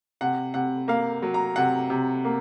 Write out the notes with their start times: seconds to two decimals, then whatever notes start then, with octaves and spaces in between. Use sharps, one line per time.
0.21 C3 F#5
0.54 C3 F#5
0.88 A#3 F5
1.22 F#3
1.34 A#5
1.56 C3 F#5
1.90 C3
2.25 A#3